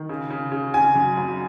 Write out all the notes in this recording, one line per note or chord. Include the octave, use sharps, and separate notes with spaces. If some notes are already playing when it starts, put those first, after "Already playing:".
Already playing: D#3
C#3
C#3
C#3
C#3 G#5
F#2
F#2